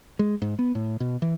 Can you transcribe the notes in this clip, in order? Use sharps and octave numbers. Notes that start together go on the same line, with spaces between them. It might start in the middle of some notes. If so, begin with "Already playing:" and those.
G#3
G#2
B3
A2
B2
E3